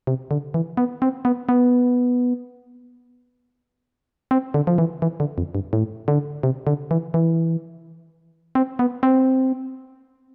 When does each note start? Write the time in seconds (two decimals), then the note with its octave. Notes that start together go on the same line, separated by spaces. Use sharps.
0.07 C3
0.31 D3
0.54 E3
0.77 B3
1.02 C4
1.25 B3
1.49 B3
4.31 C4
4.54 D3
4.67 F3
4.78 E3
5.02 E3
5.20 D3
5.38 F2
5.55 G2
5.73 A2
6.08 D3
6.43 C3
6.67 D3
6.91 E3
7.14 E3
8.55 C4
8.79 B3
9.03 C4